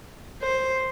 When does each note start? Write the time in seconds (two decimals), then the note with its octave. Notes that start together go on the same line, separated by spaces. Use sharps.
0.42 C5